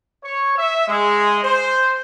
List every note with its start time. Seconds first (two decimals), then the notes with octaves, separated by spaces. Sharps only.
0.24 C#5
0.57 E5
0.88 G#3
1.43 C5